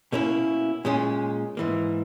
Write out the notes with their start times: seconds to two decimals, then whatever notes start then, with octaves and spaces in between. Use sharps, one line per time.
0.12 B2 A#3 C#4 E4
0.85 A#2 G#3 C#4
1.57 G#2 E3 A#3